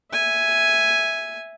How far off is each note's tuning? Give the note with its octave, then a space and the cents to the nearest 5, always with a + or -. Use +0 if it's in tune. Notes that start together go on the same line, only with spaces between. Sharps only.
E5 +0 G#5 +0